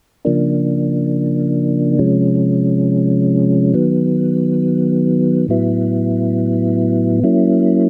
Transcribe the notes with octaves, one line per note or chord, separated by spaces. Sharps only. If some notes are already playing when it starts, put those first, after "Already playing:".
C#3 F3 A#3 D4
C3 F3 G#3 C#4
D#3 F#3 B3
A2 F#3 B3 E4
F#3 A#3 C#4 E4